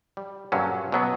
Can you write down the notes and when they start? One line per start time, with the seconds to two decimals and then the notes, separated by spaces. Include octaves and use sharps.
0.17 G3
0.52 G2 A#2 D3 F#3 C#4
0.92 B2 F#3 B3